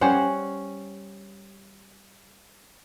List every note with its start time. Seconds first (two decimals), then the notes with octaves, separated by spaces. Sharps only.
0.01 G3 C#4 C5 F#5